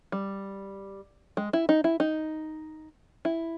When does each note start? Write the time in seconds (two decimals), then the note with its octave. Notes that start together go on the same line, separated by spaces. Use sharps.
0.12 G3
1.37 G#3
1.53 E4
1.69 D#4
1.84 E4
2.00 D#4
3.25 E4